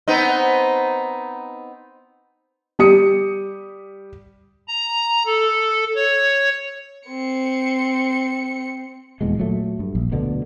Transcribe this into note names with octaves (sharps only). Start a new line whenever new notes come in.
B3 C4 D#4
G3 G4 D#6 C#7
A#5
A4
C#5
C4 C#7
D#1 E2 B2 G#3
A#2 F#3 A3
G2
A#1
D2 B2 D3